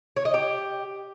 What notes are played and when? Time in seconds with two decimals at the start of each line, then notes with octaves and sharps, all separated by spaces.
0.16 C#5
0.25 D#5
0.34 G4